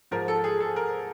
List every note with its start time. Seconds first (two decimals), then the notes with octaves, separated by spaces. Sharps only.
0.11 G#2 F3 A#4
0.28 A4
0.44 G#4
0.60 A4
0.76 A#4